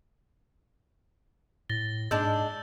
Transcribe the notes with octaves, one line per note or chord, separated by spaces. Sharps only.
A2 A6 A#6 G7
G#2 G#3 D4 E6 G6 A6